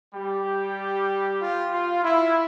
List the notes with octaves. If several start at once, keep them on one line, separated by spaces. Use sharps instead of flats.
G3 G4
F4
F4
E4